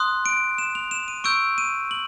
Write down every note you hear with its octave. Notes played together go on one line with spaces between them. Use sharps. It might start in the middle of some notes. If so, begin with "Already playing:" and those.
Already playing: C6 D#6 F#6
D7
E7
F7
E7
D#7
C#6 E6 G6 D7
D#7
F#7